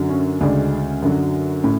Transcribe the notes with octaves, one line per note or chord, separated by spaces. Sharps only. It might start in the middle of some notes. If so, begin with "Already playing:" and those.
Already playing: F#2 D3 F#3
C#4
D2 C#3 G#3 D4
F#2 D3 F#3
A2 C#4